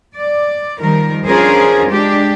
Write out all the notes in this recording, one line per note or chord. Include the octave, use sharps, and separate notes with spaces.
D5
D#3 F3 G3 A#4
C#4 D4 F4 G#4 A#4 C5
G#3 D4 G4